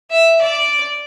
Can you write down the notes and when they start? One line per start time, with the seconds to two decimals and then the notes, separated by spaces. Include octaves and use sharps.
0.11 E5
0.41 D5